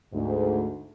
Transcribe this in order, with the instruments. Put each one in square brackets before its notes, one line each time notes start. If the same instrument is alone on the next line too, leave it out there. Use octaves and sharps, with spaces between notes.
[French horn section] D2 G#2